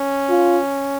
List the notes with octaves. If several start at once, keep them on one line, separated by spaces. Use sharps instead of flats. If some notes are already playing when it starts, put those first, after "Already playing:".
Already playing: C#4
F4